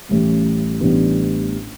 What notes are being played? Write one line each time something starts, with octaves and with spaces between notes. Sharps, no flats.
A1 A2 G3 C#4
A1 A2 G3 B3 D4